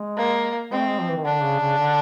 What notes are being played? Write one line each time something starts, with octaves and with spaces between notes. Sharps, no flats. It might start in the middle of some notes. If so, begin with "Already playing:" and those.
Already playing: G#3
A#3
G#3 C4
A3
G#3
F3
E3
D#3
D3 D4
C#3
C#3
D3